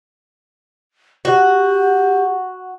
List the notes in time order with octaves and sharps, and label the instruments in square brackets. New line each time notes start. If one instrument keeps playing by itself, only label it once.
[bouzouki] F#4 [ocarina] G4